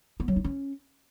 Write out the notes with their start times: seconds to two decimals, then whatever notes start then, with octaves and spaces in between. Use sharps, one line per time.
0.20 B3
0.28 F#3
0.36 D#4
0.44 C#4